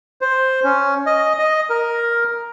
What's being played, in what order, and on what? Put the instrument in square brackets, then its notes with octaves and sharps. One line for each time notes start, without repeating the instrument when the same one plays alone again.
[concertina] C5
C#4
D#5
D#5
A#4